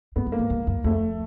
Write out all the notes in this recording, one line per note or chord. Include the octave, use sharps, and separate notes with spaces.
G2 B3
G2
A#3
G#2
G2
F#2
F2 A3